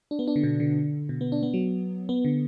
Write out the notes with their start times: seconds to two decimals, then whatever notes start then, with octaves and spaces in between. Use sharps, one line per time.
0.11 D4
0.19 B3
0.28 D4
0.36 D3
0.44 B2
0.60 D3
1.09 B2
1.21 B3
1.32 D4
1.43 B3
1.54 F#3
2.09 B3
2.25 D3